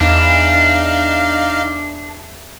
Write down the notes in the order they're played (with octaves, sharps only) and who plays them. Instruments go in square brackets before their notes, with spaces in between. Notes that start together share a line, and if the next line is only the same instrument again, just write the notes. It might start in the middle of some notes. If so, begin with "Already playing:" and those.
[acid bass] E2 [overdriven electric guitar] D4 [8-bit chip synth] D#4 F5